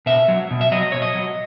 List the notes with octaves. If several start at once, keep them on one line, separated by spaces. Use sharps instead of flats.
B2 E5
F#3
B2
E5
F#3 D#5
D#5
B2 C#5
D#5
F#3